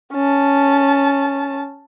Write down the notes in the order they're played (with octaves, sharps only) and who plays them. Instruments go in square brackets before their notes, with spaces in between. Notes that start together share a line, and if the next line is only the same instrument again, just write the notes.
[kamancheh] C#4 A5